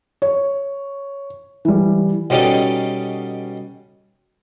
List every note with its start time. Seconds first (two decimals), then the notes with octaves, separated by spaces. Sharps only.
0.22 C#5
1.65 E3 G3
2.30 B2 G3 C#4 D#4 A4